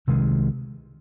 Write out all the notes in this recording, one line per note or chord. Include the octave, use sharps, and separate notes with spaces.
C2 C3 D#3 G#3